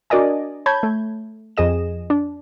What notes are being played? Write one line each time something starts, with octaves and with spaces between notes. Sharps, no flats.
D4 F#4 A#4 D5 D#5 G#5
C#5 A5 B5 G6 G#6
A3
F2 G#4 D#5 E7
D4